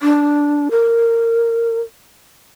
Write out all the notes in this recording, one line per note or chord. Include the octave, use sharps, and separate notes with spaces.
D4
A#4